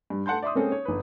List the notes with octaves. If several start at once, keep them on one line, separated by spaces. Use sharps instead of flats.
G2
A3 F#5 A5 C6 G6
D5 E5 C6 D#6
G#3 A#3 C4 C#4 A4
C#5
G1 B4